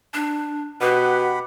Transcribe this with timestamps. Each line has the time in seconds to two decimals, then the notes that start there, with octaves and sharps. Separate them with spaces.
0.14 D4
0.81 B2 G4 B4 F#5 B5